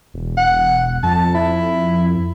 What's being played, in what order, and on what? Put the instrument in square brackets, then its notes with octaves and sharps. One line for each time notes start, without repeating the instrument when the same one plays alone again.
[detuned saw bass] E1
[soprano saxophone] F#5
[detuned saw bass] F2 [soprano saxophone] A5
[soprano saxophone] E4